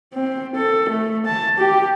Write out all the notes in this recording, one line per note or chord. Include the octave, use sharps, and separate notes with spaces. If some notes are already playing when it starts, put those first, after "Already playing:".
C4
A4
A3
A5
G4